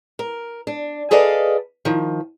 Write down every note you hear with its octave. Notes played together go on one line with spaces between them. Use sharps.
A#4
D4
G#4 A4 B4 D5 D#5 F5
D#3 F3